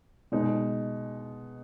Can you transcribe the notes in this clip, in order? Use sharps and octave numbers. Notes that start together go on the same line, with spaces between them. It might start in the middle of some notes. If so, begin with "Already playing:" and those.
B2 G#3 D#4